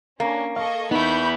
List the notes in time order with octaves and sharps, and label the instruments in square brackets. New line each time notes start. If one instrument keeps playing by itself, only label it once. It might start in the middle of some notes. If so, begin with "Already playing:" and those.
[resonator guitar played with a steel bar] A#3 [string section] C#4 D4
[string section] A4 D#5 C#6 [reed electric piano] F5
[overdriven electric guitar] B3 E4 [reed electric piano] D#4 [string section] B5 C#6 G6